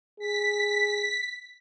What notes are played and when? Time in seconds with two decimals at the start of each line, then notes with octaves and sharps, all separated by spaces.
0.19 G#4 B6